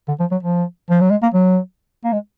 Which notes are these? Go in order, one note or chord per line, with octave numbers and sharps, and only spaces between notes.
D3
F3
F#3
F3
F3
F#3
G#3
A#3
F#3
A#3
G#3